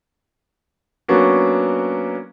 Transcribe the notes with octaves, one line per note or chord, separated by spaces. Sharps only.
F#3 A#3 B3 C#4 D4 F#4